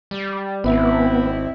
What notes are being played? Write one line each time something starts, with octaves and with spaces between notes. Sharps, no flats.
G3
G#1 B3 C4 E4